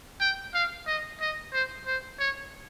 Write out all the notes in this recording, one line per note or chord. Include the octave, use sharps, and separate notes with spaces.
G5
F5
D#5
D#5
C5
C5
C#5